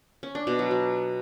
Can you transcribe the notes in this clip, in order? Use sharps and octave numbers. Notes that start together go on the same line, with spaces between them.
C#4
D4
B2
F#3
F#3